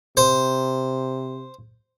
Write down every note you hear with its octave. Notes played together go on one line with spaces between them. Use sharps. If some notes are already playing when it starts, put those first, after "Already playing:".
C3 C5